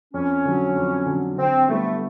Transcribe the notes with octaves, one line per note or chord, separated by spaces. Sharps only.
F2 C#4
D3 F#3
F2
D3 F#3
D3 C4
G3 A3 B3 E4